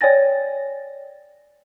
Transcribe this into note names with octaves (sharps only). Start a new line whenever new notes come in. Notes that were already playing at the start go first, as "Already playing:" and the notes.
C#5 D5 G5 G#5 A6 A#6